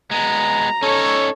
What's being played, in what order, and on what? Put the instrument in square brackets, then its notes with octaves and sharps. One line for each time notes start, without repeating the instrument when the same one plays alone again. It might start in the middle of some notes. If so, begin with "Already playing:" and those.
[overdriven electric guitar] G#3 B3 [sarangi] A#5
[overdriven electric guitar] C#4 D#4 [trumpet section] A4 C#5